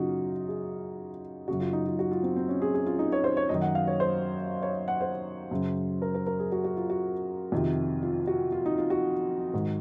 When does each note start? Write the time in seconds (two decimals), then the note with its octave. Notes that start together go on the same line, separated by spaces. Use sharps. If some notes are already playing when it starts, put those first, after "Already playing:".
Already playing: F#2 C#3 D#4 F4 F#4
0.48 G#4
1.48 F#2 C#3 F#4
1.60 F4
1.73 D#4
1.87 F4
1.99 F#4
2.11 F4
2.23 C4
2.36 C4
2.49 C#4
2.62 G#4
2.74 G#4
2.86 F4
2.99 D#4
3.12 C#5
3.24 C5
3.37 C#5
3.49 F#2 D#3 D#5
3.62 F#5
3.75 F5
3.87 C#5
4.00 C5
4.63 C#5
4.88 F#5
5.01 C5
5.51 F#2 C#3
6.02 A#4
6.14 A#4
6.27 A#4
6.39 G#4
6.52 F#4
6.64 F#4
6.77 F4
6.90 F#4
7.52 F2 C3 D#3
8.03 F4
8.27 F#4
8.52 F4
8.66 D#4
8.78 F4
8.90 F#4
9.53 G#2 D#3